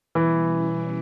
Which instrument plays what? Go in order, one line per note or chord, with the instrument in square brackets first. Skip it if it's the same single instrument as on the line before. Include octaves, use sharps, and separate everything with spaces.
[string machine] B2 G3 B3 [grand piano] E3
[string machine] B2 G3 C#4 E4